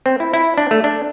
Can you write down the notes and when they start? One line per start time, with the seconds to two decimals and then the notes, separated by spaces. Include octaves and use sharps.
0.06 C4
0.20 E4
0.33 E4
0.58 D4
0.71 A3
0.84 D4